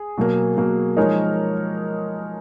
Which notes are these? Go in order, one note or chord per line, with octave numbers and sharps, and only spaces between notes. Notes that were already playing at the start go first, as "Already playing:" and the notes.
Already playing: G#4
B2 F#3 A#3
B2 F#3 A#3
F3 G#3 D#4 A#4 C#5